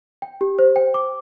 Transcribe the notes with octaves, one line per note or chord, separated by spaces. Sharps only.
G5
G4
C5
G5
D6